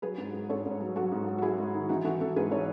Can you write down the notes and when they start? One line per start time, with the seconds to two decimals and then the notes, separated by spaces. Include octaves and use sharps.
0.02 F#3 G#4 B4
0.18 G#2
0.33 G#2
0.49 G#2 A4 C#5
0.66 G#2
0.80 F#3
0.96 F#3 F#4 A4
1.12 G#2
1.27 G#2
1.38 F#4
1.42 F#3 E4 G#4
1.58 G#2
1.74 D#3
1.89 E3 D#4 F#4
2.04 E3 F#4 A4
2.20 E3 F#4 A4
2.36 G#2 G#4 B4
2.51 E3 A4 C#5